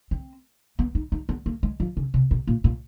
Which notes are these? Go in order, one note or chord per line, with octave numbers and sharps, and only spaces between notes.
C4
B3
D#4
D#4
B3
A#3
G#3
F3
C#3
C3
B2
A#2
A#2